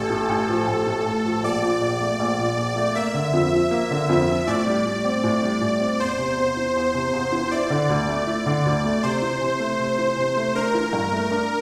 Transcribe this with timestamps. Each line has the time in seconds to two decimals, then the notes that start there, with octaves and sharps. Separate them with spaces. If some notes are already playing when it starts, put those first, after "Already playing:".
Already playing: A1 A4
0.10 A2
0.29 A1
0.49 F3
0.67 A1
0.87 A2
1.05 A1
1.25 F3
1.43 A#1 D5
1.62 A#2
1.81 A#1
2.01 A3
2.19 A#1
2.39 A#2
2.57 A#1
2.76 A3
2.95 A#3 E5
3.14 D3
3.33 F2
3.53 F3
3.71 A#3
3.91 D3
4.09 F2
4.28 F3
4.47 A2 D5
4.67 G3
4.86 A2
5.05 C4
5.24 A2
5.43 G3
5.61 A2
5.80 C4
5.99 E2 C5
6.18 C3
6.37 E2
6.57 E3
6.76 E2
6.94 C3
7.13 E2
7.32 E3
7.51 E4 D5
7.70 D3
7.89 D2
8.08 A3
8.27 E4
8.46 D3
8.66 D2
8.84 A3
9.03 C3 C5
9.22 E3
9.41 C3
9.60 A3
9.79 C3
9.98 E3
10.17 C3
10.36 A3
10.55 D4 A#4
10.74 E3
10.93 G2
11.12 A3
11.31 D4